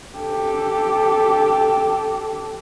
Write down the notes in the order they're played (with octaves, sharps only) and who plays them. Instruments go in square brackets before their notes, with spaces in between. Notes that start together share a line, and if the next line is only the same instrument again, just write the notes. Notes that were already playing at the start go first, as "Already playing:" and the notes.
[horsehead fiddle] G4 A4